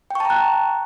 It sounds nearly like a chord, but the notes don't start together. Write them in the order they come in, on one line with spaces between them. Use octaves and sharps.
G5 C#6 A5 A#5 F#6